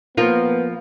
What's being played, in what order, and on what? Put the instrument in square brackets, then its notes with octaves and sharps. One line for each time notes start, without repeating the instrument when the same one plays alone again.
[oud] F3 A#3 F4 [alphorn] B3